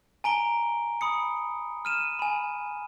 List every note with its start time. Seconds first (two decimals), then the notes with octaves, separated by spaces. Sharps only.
0.24 G#5 A#5 D7 G7
1.01 B5 D#6 C#7
1.85 F6 D#7 E7
2.19 G#5 B5